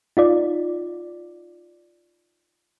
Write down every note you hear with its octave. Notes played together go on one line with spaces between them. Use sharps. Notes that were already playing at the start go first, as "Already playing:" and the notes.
D#4 F4 D5